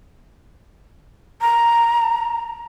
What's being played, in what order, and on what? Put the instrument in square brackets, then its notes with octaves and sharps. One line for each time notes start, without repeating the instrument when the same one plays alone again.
[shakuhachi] A#5